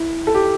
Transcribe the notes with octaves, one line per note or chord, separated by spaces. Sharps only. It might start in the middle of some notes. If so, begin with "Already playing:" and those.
Already playing: E4
A4
G4